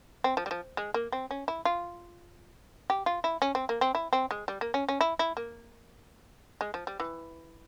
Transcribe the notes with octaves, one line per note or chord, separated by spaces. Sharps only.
C4
F3
G3
F3
G#3
A#3
C4
C#4
E4
F4
G4
F4
E4
C#4
C4
A#3
C4
E4
C4
G#3
G3
A#3
C#4
C#4
E4
E4
A#3
G#3
F3
G3
E3